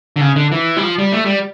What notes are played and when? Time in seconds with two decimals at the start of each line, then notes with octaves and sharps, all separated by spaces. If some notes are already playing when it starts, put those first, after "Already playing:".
0.16 D3
0.21 C#3
0.36 D3
0.52 E3
0.76 G3
0.83 F3
0.98 G3
1.12 A3
1.26 G3